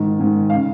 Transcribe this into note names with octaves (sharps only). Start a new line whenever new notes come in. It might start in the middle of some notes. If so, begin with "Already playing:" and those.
Already playing: G#2 D#3
G#2 D#3
F5
C#3